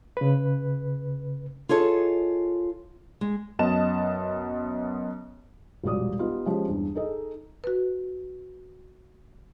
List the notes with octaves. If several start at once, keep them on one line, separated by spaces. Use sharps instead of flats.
C#3 B4
F4 G#4 A4 C#5 D#5
G#3
F#2 B3 D#5 A5 E7
E1 A#1 G3 F#4 D5 D#6
B3 D#4 F4 G4
F3 G#3 C#4 G4 G#4
E2 G2
D#4 G#4 A4 D#5
F#4 B4